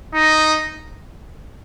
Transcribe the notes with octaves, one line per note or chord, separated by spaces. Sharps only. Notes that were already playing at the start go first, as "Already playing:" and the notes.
D#4